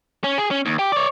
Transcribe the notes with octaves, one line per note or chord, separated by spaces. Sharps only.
C#4
G#4
C#4
D#2
G4
C#5 D5